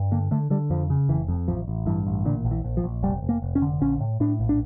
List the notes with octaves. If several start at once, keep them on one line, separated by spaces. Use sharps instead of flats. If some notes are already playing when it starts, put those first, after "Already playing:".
Already playing: G2
D3 A#3
D3 A3
D3 G3
F2 F3
C#3
F1 E3
F2
A1 F3
A1
G2 E3
A1
A#2 D3
A#1
E3
A#1
F3
A#1
F1 G3
F1
A#3
F1
C#4
D3
A#1 C#4
A2
A2 D4
A#1
D4